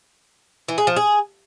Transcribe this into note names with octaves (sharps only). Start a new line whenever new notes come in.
E3
G#4
F3
G#4